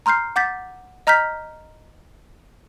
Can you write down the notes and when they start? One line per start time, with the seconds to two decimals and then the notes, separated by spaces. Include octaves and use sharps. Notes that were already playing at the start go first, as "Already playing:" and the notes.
0.06 A#5 C6 F6 G6 C7
0.36 F#5 D6 G6 A6 B6
1.07 D#5 A#5 F6 G6 B6